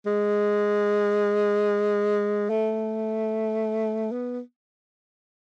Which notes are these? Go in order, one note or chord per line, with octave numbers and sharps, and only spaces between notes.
G#3
A3
B3